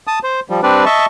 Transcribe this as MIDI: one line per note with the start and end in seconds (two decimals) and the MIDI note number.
0.07 0.19 81
0.07 0.19 87
0.23 0.40 72
0.50 0.61 53
0.50 0.61 55
0.63 0.85 55
0.63 0.85 60
0.63 0.85 62
0.63 0.85 71
0.63 0.85 74
0.86 1.06 75
0.86 1.06 76
0.86 1.06 81
0.86 1.06 85